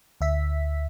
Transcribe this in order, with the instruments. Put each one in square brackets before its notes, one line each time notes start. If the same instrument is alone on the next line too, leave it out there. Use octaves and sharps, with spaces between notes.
[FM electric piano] D2 E5 B6